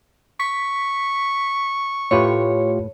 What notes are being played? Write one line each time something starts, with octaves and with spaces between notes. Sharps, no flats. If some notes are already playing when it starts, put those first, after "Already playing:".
C#6 B6
A2 A3 F4 G4 B4 C#5